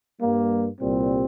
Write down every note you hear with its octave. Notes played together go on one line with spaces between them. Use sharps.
G2 G3 A#3
C2 A#2 G3 C4